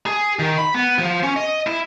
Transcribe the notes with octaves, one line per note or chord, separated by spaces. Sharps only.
G#4
D#3
B5
B3
F3
C#4
D#5
E4